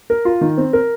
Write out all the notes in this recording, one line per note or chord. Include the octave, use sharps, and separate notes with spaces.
A#4
F4
D#3
C4
A#4